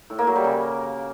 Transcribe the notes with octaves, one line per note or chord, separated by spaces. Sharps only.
A2
A#3
F#3
G3
C#3